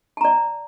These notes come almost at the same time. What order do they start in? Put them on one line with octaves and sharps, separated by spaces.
A5 A#5 D5